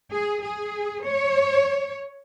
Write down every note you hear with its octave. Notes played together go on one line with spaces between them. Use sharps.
G#4
G#4
C#5